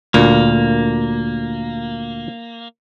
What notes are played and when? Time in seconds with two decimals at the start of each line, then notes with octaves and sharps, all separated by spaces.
0.14 D2 A#2 A#3